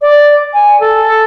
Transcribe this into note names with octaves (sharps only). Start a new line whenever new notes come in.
D5
G#5
A4